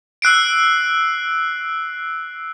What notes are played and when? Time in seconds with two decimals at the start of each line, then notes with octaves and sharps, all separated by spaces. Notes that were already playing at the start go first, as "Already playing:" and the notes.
0.22 E6 F#6 C7 D7